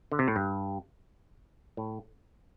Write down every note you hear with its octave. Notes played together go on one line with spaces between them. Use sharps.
D3
C3
A2
G2
A2